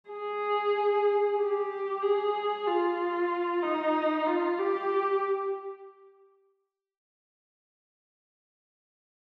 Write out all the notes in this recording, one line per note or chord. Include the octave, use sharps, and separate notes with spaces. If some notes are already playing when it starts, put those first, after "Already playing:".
G#4
G4
G#4
F4
D#4
F4
G4